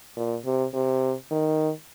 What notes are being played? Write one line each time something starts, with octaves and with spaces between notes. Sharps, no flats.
A#2
C3
C3
D#3